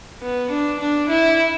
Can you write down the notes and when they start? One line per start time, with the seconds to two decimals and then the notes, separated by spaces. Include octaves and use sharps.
0.22 B3
0.50 D4
0.79 D4
1.09 E4